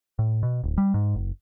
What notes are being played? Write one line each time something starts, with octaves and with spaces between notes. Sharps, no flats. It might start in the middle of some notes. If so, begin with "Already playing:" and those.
A2
B2
D1
G3
G#2
F#1